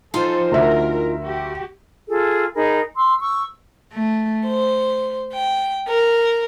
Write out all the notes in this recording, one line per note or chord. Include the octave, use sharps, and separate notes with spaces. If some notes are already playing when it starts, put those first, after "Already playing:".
F3 D#4 F4 A4 C5 G#5
D2 A#4 E5
F#4 G4
F4 G#4 A4
D#4 G#4 A#4 B5
C6 E6
C#6 E6
A3
C5
G5
A#4